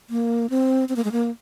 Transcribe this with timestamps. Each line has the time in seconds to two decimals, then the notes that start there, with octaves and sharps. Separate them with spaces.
0.10 A#3
0.50 C4
0.89 C4
0.96 A#3
1.04 G#3
1.12 A#3